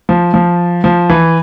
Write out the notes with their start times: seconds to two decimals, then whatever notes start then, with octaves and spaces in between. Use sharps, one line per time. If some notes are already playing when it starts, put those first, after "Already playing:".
0.09 F3
0.34 F3
0.84 F3
1.10 E3